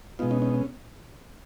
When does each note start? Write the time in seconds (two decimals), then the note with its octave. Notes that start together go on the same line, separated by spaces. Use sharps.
0.19 B2 G#3 B3 D#4 F4
0.31 C#4 D#4
0.42 C#4 D#4
0.54 C#4